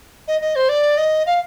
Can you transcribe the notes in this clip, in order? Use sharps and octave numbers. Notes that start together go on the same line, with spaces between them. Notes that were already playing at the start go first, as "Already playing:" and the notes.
D#5
D#5
C5
D5
D#5
F5